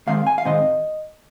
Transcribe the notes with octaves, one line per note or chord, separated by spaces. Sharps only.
G#2 D#3 G#3 C4 F5
G#5
F5
G#2 D#3 G#3 C4 D#5